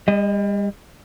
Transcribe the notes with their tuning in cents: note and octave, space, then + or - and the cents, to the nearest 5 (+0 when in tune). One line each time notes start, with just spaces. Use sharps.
G3 +40 D#5 +0